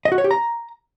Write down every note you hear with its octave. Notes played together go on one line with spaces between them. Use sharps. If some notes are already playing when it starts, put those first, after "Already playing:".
D#5
F#4
C#5
G4
A#5